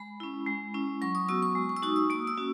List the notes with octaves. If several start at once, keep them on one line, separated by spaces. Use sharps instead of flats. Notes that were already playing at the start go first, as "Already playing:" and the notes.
Already playing: G#3 B5
C#4 E4
G#3
C#4 E4
F#3 C#6
D#6
B3 F#4 E6
C#6
G#3
C#6
E6
D#4 F#4 D#6
E6
A#3 D#6
E6
C#4 F#4